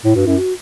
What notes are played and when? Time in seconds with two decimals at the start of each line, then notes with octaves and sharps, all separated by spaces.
0.05 A2 E4
0.16 G2 F#4
0.26 F#2 E4
0.38 F#4